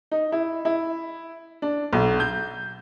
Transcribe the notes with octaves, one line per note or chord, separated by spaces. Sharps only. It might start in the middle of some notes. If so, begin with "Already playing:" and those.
D#4
E4
E4
D4
B1
G6